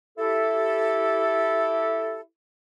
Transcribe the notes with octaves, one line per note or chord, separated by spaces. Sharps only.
E4 G4 A4